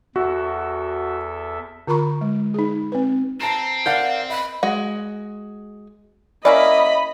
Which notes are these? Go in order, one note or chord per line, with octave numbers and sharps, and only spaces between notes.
E2 F#4 A4 E5
D3 F4 A#4 A#5 B5 C#6
G#3
D#4 G#4
C4 B4
C4 A5 A#5 C7 E7
A#4 D5 F5 F#5 G6
D#5 B5
G#3 F#4
A#3 C#4 E4 D5 D#5 B5